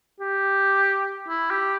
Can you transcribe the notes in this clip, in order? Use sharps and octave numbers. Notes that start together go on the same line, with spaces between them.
G4
E4
G4